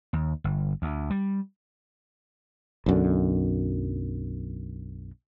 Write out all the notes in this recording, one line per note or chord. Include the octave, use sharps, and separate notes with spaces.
D#2
G1
D2
G3
B1 F#2 D3